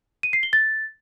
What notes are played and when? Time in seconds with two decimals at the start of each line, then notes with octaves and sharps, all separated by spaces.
0.23 D#7
0.33 C7
0.43 G7
0.53 A6